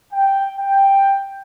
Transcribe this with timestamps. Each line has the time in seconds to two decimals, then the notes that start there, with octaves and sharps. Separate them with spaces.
0.12 G5
0.59 G5